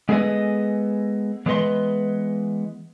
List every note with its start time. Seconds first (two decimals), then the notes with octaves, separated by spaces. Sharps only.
0.09 G#3 B3 G#4 A4 B4 D#5
1.46 E3 G#3 B3 B4 D#5 C6